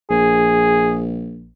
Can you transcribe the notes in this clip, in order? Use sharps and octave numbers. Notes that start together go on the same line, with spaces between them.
A#1 G#4